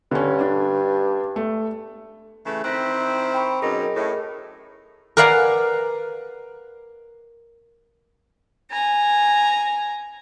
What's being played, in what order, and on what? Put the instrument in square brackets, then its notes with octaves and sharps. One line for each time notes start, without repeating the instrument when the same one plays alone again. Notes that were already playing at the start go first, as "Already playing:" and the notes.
[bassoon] G2 [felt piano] D3 C#4
[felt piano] D4
A3
[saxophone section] C#3 E3 A3
[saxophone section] D#3 C4 E4 [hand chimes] F#6 A#6 B6
[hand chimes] G5 B5 C#6
[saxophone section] F#2 B2 D#4 [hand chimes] G#4 A#4 D#5
[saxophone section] A2
[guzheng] A#4 B4 D5 F5 F#5 G#5
[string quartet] G#5 A#5